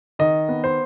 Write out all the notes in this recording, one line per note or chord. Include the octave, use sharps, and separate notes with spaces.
D#3 D#5
B3
C5